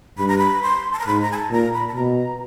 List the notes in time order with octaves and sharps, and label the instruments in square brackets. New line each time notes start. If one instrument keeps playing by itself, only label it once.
[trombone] G2 [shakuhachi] B5
[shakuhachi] A#5
B5
C6
A5
A#5
[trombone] G#2 [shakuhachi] B5
[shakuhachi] A#5
G#5
A5
[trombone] A#2 [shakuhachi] A#5
[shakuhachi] B5
A5
[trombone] B2 [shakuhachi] A#5